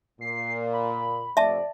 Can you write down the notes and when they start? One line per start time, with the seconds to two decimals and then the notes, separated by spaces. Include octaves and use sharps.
0.21 A#2 C7
0.73 B5
1.37 F2 C3 A3 D5 E5 A5